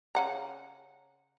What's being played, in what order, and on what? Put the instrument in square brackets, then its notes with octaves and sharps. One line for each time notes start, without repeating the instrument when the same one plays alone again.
[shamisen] C#3 F#5 A#5